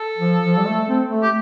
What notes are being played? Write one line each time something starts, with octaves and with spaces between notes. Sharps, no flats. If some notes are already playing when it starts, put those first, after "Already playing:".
Already playing: A4
F3
F3
G3
A3
C4
A3
G4